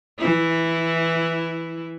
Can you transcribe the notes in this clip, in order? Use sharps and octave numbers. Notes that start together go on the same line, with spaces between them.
E3 E4